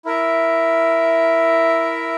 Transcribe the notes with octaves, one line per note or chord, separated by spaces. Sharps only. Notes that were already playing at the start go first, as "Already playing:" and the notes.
E4 A#4 E5